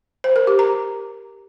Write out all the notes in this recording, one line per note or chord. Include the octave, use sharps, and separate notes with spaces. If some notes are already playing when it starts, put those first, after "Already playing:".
C5
A#4
G4
A#5